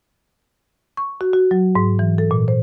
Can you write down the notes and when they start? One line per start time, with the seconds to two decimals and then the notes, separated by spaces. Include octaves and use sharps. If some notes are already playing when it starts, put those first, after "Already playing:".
0.97 C#6
1.21 F#4
1.33 F#4
1.51 F#3
1.75 G#2
1.99 E3
2.18 A4
2.31 A#2
2.48 C5